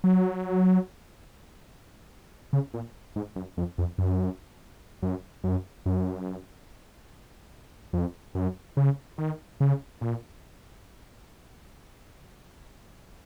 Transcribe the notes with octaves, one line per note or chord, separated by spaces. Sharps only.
F#3
C#3
A#2
G#2
F#2
F2
F2
F#2
F#2
F#2
F#2
F2
F#2
C#3
D#3
C#3
A#2